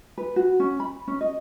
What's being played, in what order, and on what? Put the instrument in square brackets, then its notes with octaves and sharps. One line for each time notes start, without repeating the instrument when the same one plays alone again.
[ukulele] B4
F#4
C#4
B5
C#4
D#5